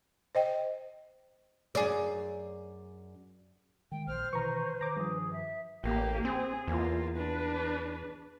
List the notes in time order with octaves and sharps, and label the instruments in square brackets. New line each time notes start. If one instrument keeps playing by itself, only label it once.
[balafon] C5 D#5 G5
[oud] F#2 G#4 D5
[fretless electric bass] D#3 G#3 [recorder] G5
[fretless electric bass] A#1 [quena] C5 [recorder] F6
[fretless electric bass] B2 D#3 E3 [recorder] B4 [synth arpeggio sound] A#5 C#6
[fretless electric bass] D#3 [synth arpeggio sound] A#5 D6
[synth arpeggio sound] G2 F3 [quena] G#4
[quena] E5
[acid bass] A1 [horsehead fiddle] A#3 G4
[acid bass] C4 [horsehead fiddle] G#4
[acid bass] E2 [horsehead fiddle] A#3 F4
[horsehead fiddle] D4 B4